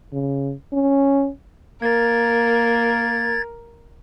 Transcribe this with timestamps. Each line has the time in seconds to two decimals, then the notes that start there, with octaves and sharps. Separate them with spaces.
0.13 C#3
0.73 C#4
1.82 A#3 A#4 G#6 A6